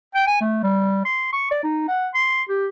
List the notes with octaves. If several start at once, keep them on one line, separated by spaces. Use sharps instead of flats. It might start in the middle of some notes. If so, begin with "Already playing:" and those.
G5
G#5
A3
G3
C6
C#6
D5
D#4
F#5
C6
G4